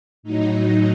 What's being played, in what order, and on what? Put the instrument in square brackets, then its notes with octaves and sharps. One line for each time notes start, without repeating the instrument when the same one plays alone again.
[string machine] A2 F#3 D#4